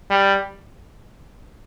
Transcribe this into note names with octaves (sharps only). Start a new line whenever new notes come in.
G3